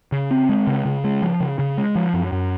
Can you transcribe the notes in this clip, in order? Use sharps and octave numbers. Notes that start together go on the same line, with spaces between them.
C#3
C4
G#3
C#3
C#3
G#3
F3
C#3
C#3
G#3
F3
F#2
F#2